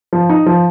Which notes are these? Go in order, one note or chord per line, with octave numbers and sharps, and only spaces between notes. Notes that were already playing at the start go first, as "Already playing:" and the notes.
F3
D#4
F3